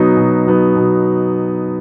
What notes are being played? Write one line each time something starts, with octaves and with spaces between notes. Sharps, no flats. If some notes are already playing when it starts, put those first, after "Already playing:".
Already playing: B2 F#3 B3 D#4
B2
F#3 B3 D#4
B2